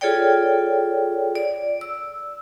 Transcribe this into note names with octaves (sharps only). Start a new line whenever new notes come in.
F4 G#4 A4 C#5 D5 G5
D5
E6